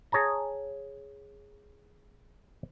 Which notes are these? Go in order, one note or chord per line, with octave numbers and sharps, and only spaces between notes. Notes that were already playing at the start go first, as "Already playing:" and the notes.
G#4 C#5 A5 A#5